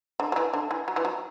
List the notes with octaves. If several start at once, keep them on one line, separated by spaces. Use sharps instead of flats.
D3
F#3
E3
D3
E3
F#3
E3
F#3